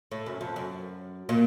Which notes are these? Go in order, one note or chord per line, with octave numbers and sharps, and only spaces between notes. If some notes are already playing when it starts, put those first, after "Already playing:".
A2
F#2
F2
F#2
A#2